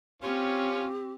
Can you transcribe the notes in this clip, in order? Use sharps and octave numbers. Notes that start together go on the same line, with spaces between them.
C4 C#4 F4 G4 C#5